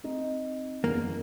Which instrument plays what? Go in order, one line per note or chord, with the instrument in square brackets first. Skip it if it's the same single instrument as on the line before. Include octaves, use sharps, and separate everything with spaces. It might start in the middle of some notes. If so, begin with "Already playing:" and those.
[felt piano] C4 D#4 D#5
[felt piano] F#1 E2 [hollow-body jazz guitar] A#3